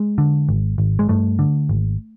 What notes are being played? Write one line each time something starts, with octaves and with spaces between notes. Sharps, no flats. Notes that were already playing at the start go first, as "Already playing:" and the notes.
Already playing: G#3
D3
G#1
G#1
G#3
G2 A3
D3
G#1